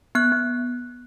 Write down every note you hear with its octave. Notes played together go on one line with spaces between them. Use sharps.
B3 F#6
B3